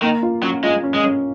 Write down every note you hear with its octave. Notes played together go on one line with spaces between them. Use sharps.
D#3 A#3
F4
F#3 C#4
G#3 F4
C#4
G#3
C#4